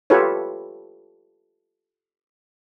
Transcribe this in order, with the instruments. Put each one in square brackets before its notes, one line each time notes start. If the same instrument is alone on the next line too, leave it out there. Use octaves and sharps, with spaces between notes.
[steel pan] F4 G4 A4 B4 C#5